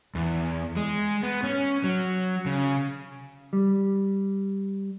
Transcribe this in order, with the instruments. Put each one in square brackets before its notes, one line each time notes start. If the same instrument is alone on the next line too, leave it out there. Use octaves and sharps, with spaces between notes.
[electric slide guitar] E2
G#3
B3
C#4
F#3
C#3
[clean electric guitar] G3